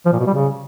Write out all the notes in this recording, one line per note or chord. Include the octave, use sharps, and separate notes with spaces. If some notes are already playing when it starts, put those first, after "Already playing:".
F3
A#2
B2
G3
C#3